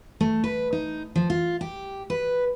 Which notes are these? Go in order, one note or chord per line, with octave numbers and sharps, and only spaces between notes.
A3
B4
D#4
F3
F4
G4
B4